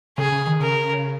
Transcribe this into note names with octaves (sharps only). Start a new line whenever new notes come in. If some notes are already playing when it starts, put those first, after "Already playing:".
C#3 G#4
C#3
D#3
C#3 A#4